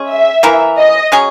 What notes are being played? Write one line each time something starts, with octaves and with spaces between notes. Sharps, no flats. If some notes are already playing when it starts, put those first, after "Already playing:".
Already playing: G#3 C#4 G#4
E5
E3 A#3 E4 A#4
D#5
F#3 C#4 G#4